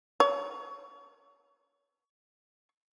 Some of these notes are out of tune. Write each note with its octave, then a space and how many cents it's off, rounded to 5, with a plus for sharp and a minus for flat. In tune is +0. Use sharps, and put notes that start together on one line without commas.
C#5 +30